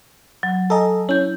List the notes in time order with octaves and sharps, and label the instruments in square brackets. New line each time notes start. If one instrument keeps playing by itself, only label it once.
[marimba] F#3
[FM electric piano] A4 D#5 [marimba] G#5 A#5
[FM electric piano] C#4 [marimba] E4 G6